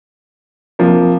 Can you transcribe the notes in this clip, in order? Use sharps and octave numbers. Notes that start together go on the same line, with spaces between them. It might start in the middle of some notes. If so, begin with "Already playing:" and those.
C3 F3 A#3